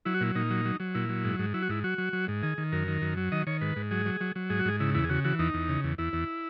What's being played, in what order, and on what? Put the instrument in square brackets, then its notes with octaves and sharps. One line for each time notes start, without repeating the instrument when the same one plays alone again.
[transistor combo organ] F#3 E4
F#4
A#2 E4
A#2 D#4
F#3
F#3
F#3
A#2 E4
F#3
G#2
G#2
F#3 E4
F#4
G#2 E4
F#3 F#4
F#3
F#3
G#2
D#3 G#4
D#3
F#2 A#4
D#3
F#2
F#3
D#3 D#5
D#3 C#5
G#2 B4
G#2
F#3 G#4
F#3
F#3
F#3
G#2 G#4
F#4
G#2 G#4
C#3 E4
E2 E4
G#4
C#3 F#4
E3 F#4
E2 D#4
E2
C#3
E2
E2 E4
E2